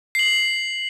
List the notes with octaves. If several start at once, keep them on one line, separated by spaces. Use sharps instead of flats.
C7 F#7